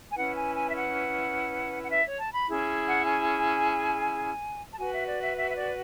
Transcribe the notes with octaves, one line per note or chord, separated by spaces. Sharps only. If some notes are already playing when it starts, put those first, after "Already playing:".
G#5
C#4 E4 B4 F#5
G#5
G#5
E5
F#5
F#5
E5
C#5
A5
B5
C#4 E4 G#4
F#5
G#5
A5
F#4 B4 G#5
E5
D5
E5
E5
E5
D5